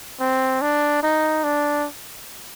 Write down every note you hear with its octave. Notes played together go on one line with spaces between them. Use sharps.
C4
D4
D#4
D4